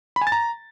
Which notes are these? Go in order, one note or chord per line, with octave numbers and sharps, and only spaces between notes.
B5
G#5
A6
A#5